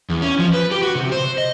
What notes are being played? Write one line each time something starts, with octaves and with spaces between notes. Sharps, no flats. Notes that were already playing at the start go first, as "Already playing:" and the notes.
E2
C#4
F3
B4
G4
F#4
C3
C5
D#5